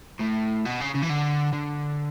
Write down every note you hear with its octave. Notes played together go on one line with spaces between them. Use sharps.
A2
B2
C#3
C#3
E3
D3
D3